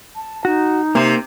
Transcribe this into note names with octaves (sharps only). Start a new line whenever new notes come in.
A5
D#4 F#4
C3 A#3 C5